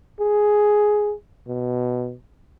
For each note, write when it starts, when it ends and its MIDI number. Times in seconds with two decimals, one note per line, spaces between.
0.20 1.14 68
1.48 2.15 47